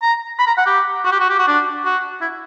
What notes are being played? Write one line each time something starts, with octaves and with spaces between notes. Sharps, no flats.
A#5
B5
A#5
F#5
G4
F#4
G4
F#4
G4
F#4
D4
F#4
E4